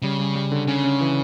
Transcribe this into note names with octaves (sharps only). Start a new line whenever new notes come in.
C#3 G3
G3
G3
D3
C#3 C#4
C#4
E3